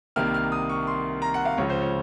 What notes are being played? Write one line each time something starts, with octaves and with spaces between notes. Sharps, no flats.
C2 C3 D#3 A#3 F6
F6
D#6
C#6
C6
A#5
F#5
F5
C#2 C#3 F3 C#5
C5
C#5